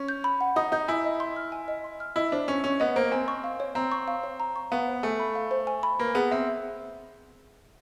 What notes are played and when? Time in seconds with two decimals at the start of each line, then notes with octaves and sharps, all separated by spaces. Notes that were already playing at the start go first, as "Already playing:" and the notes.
Already playing: C#4
0.09 G6
0.24 B5
0.41 F#5
0.56 D#4 D#6
0.72 D#4 G6
0.88 E4 G#5
1.04 D#5
1.20 C6
1.36 F6
1.52 G#5
1.68 D#5
1.84 C6
2.00 F6
2.16 E4 D#5
2.32 D4 C5
2.48 C#4 G#5
2.64 C#4 C#6
2.80 B3 D#5
2.96 A#3 C5
3.12 C4 G#5
3.28 C#6
3.44 F5
3.60 C#5
3.75 C4 A#5
3.92 C#6
4.08 F5
4.23 C#5
4.40 A#5
4.56 C#6
4.72 B3 F5
4.87 C5
5.03 A3 G#5
5.20 B5
5.35 F5
5.51 C5
5.67 G#5
5.83 B5
5.99 A#3 B4
6.15 B3 G#4
6.31 C4 E5